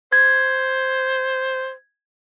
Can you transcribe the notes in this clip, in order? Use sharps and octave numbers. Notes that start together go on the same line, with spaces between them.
C5 G#6